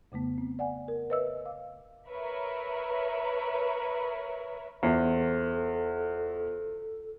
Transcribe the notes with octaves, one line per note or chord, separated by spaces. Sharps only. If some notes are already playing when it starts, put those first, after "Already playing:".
F2 C#3 A3 B3
C4
D5 F#5 G#5
A#4
B4 C#5 D#5 E5 E6
F5 D6 E6
A#4 B4 C#5 E5 B5
E2 F4 A4 C5